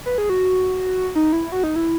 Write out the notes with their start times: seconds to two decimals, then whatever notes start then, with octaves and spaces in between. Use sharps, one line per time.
0.06 B4
0.18 G#4
0.30 F#4
1.15 D#4
1.33 E4
1.52 F#4
1.64 D#4
1.76 E4